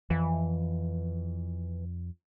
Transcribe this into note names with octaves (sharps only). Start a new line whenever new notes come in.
F2 E3